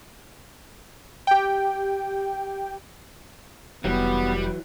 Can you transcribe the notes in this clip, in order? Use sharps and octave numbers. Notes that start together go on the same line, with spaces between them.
G4 G5
F1 E3 F#3 G3 B3